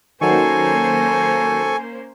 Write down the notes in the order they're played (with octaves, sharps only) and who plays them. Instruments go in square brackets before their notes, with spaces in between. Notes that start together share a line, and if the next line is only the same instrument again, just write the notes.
[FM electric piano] D#3 F#3 [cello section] A#3 C#4 C5 [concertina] A4 C#6 [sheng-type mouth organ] G#5